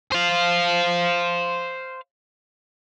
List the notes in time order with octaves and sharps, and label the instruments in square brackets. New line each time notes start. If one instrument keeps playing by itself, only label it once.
[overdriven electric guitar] C5 F5